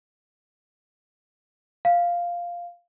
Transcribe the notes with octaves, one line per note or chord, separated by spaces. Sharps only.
F5